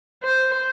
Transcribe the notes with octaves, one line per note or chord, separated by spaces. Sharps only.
C5